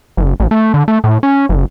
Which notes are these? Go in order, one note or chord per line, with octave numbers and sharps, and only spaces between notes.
F#1
A1
A3
D3
A3
A2
C#4
F#1